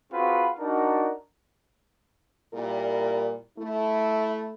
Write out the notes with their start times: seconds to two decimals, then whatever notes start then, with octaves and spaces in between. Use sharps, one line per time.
0.12 C4 F4 F#4 G#4 B4
0.59 D4 D#4 F#4 A#4
2.54 A#2 G3 E4 A#4
3.58 A3 E4